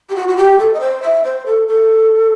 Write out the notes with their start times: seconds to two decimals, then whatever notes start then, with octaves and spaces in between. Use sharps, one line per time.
0.09 G4
0.15 F#4
0.28 F#4
0.37 G4
0.59 A4
0.74 D#5
0.80 C5
1.02 E5
1.24 C5
1.46 A4
1.68 A4